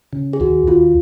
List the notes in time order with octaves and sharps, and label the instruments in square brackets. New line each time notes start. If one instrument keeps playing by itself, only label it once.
[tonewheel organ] C#3
[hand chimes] G#4
[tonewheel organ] D#2 [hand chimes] F#4
[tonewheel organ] D#2 [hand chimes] F4